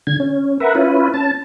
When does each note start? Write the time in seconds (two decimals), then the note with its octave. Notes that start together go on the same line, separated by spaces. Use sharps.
0.07 D3 G#6
0.20 C#4
0.60 A#4 B4 E5 F#5
0.75 C#4 E4 F4 B4
1.14 C#4 A5